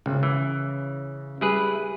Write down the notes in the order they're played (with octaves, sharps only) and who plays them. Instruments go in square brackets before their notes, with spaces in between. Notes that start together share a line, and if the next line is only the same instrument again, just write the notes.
[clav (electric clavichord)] G#1 [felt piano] C#3
[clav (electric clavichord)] E3
[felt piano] G3 [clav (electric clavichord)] E4 G#4 B4